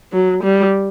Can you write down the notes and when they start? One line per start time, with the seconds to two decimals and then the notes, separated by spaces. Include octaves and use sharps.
0.13 F#3
0.43 G3